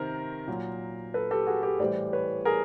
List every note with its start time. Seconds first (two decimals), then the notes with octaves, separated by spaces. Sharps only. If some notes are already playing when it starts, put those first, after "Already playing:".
Already playing: C3 D#3 A#4 C5
0.48 A#2 F#3
1.14 A4 B4
1.31 G4 A4
1.47 F#4 G#4
1.63 G4 A4
1.80 A2 E3 G3 C5 D5
2.13 B4 C#5
2.45 G#4 A#4